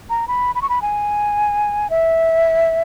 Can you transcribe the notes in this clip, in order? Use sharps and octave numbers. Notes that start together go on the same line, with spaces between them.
A#5
B5
B5
C#6
B5
G#5
E5